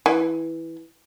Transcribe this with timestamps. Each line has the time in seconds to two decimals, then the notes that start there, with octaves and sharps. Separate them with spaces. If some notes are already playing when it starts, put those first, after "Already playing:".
0.06 E3